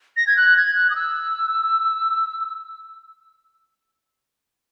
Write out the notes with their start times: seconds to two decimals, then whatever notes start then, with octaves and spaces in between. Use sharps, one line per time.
0.17 A#6
0.27 G#6
0.37 F#6
0.57 G#6
0.75 F#6
0.90 D#6
0.96 E6